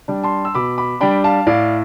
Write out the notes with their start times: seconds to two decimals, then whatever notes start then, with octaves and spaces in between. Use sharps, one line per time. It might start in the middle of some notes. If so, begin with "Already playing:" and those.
0.08 G3 D4
0.23 A5 C6
0.45 E6
0.55 B2 B5 D6
0.78 B5 D6
1.00 G3 D4 G5 B5
1.24 F5 A5
1.47 A2 D5 F5